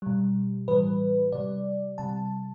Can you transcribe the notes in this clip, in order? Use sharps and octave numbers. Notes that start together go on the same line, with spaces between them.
B2 G3
A2 E3 G3 B4
C3 G3 D5
C3 G3 A5